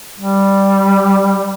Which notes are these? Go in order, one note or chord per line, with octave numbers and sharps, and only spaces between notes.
G3